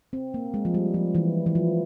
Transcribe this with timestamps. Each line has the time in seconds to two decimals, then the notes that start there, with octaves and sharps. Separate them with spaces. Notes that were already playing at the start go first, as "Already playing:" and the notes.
0.13 C4
0.34 A#3
0.54 G#3
0.65 F3
0.74 G3
0.94 F3
1.15 E3
1.46 E3
1.55 F3